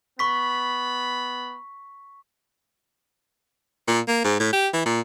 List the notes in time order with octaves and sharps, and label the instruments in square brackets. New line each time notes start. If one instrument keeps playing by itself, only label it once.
[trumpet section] B3 B5 [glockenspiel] C#6 B6
[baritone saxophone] A#2
A#3
G#2
A2
G4
E3
A#2